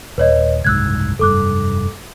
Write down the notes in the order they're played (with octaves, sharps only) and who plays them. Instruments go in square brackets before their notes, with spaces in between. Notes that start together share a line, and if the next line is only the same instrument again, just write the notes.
[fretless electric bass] D#1 [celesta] B4 C#5 D#5
[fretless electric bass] F#1 C2 G#2 [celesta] E6 F#6 G#6
[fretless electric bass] F1 G2 [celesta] A4 D6 F#6